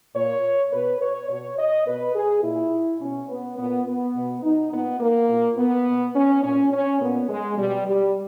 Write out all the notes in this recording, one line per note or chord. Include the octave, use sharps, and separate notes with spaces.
A#2 C#5
B2 B4
C#5
B2 C#5
D#5
B2 B4
G#4
A#2 E4
B2 C#4
B3
A#2 B3
B3
B2
D#4
A#2 B3
A#3
A#2
B3
B2
C#4
A#2 C#4
C#4
A#2 B3
G#3
B2 G3
G3